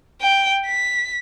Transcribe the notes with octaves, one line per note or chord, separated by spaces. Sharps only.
G5
B6